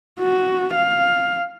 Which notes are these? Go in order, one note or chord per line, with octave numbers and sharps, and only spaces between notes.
F#4
F5